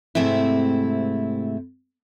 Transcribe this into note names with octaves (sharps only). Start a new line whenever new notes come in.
G#2 C3 A3 C4 E4